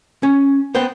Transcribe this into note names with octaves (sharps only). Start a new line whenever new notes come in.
C#4
B3 C5 G5